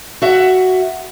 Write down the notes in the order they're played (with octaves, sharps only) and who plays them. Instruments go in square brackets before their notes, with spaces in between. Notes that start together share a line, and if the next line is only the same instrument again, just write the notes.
[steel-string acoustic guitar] F#4 E5 F#5